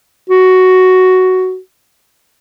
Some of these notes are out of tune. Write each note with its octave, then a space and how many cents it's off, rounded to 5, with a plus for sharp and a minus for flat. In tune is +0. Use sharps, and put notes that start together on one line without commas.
F#4 +5